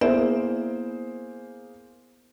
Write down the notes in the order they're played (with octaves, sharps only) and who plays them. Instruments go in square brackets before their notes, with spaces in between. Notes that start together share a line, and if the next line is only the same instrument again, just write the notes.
[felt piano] A#3 G#4 C5 [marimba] B3 E4 E5